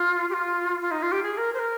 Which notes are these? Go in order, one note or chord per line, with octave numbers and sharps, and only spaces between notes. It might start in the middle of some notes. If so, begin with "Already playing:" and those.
Already playing: F4
G4
F4
F4
D#4
F4
G4
G#4
A#4
C5
A#4